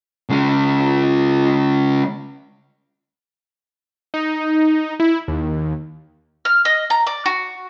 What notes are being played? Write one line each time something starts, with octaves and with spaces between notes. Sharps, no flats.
C#3 G#3
D#4
E4
D#2
F6
D#5
A#5
D5
F#4